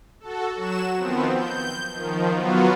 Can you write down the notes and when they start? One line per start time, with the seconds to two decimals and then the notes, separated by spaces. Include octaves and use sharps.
0.20 F#4 A4
0.55 F#3 F#4 E7
0.96 D#3 F3 B3 C4
1.34 G6
1.93 D#3 F3
2.32 F#3 B3 F4 F#4